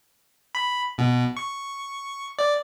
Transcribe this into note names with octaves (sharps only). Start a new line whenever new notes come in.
B5
B2
C#6
D5